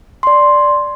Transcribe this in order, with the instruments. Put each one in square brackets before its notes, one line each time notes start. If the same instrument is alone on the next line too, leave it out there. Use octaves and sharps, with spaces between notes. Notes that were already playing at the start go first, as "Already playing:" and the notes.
[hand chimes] D5 C6